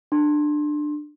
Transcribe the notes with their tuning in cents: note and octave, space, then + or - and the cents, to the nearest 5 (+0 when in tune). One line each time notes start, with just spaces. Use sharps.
D4 +20 C6 +20